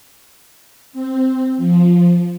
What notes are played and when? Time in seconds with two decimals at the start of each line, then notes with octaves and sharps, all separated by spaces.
0.93 C4
1.57 F3